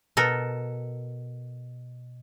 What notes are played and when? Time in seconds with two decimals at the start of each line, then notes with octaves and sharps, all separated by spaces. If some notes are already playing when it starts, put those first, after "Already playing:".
0.17 B2 A4 A#4